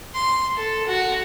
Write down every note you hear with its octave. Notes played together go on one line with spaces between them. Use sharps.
C6
A4
F#4